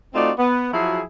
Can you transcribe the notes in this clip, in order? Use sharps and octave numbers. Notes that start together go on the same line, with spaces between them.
A3 C4 D#4 F4 F#4 D5
B3
F3 F#3 E4 F#4 G#4